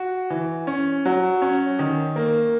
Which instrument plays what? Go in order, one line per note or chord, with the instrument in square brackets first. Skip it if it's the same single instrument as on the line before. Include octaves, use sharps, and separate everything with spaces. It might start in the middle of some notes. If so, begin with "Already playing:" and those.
Already playing: [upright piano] F#4
E3
C#4
F#3
C#4
D#3
A#3